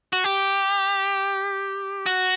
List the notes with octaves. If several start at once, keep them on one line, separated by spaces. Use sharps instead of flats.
F#4
G4
F#4